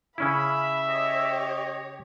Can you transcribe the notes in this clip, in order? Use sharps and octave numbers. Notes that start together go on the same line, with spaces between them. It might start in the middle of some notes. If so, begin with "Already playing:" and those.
C#3 C#4 E4 E5 B5
G4 C#5 D#5